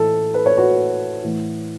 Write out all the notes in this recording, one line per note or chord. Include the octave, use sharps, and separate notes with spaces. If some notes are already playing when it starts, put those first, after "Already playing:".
Already playing: A2 E3 A4
B4
C#5
F#4 B4
A2 E3